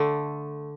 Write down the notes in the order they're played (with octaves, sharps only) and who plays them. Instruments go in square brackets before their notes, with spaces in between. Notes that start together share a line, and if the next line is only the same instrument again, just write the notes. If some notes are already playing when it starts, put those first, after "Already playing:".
Already playing: [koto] D3 A3